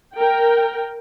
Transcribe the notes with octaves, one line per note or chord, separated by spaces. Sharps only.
A#4 G5